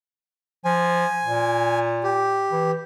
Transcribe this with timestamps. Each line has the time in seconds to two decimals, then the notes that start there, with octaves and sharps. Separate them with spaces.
0.65 F3 G#5
1.24 A#2
2.03 G4
2.52 E3